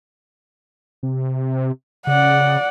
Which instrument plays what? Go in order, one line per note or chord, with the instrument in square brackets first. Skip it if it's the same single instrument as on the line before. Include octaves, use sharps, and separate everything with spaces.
[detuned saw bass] C3
[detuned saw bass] C#3 [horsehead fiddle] D5 F#5